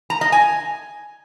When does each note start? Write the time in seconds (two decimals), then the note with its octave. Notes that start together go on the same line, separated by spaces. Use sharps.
0.10 A#5
0.21 D#5
0.32 G#5